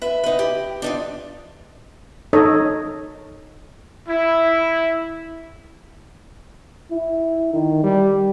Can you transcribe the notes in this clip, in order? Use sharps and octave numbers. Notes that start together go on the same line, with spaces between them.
B4 E5
D#4 B4
G4
D4 D#4 F4
D#4 A4 C#5 D#5
E4
E4
D#3
G3